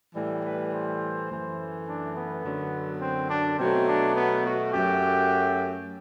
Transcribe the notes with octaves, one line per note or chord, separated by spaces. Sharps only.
A2 E3 G3
B4
C5
F#2 E3 A3
D4
B3
F#2 D3 F#3
C4
D4
B2 F#3 A3 C4
D4
B3
F#4
F#2 F#3 A3 G4